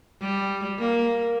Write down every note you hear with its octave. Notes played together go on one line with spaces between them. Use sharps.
G3
A#3